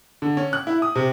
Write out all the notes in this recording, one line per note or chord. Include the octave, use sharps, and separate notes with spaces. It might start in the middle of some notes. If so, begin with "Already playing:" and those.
D3
C#4
F#6
E4
D#6
C3